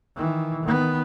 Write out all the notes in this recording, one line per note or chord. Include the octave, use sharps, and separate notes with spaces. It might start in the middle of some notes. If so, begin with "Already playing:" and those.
D#3 E3
D#3 B3